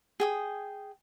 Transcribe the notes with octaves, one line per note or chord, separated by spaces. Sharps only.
G#4 G5 D#6